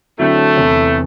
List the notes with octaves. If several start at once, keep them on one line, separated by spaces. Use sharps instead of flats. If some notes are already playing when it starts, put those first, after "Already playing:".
A2 D3 F#3 A3 C4 E4
E2 C3 E3